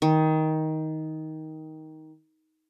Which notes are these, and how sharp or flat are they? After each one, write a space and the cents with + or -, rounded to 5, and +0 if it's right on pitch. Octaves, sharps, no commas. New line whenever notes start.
D#3 +15